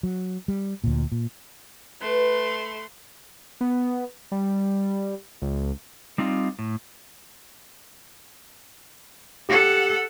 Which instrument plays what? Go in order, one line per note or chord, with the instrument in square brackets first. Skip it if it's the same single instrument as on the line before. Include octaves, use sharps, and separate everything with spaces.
[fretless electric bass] F#3
G3
D2 A#2
A#2
[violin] A3 C6 [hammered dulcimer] B4
[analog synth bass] B3
G3
C#2
[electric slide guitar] G3 C4 D#4 F4
A2
[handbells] G4 [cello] A4 F#5